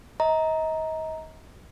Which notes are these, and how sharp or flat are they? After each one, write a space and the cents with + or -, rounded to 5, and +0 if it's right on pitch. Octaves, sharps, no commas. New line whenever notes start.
D#5 +35 A#5 +0